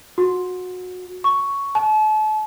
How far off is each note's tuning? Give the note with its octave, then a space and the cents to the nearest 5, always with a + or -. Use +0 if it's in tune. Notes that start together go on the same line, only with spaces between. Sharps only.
F#4 -25
C#6 +5
A5 -35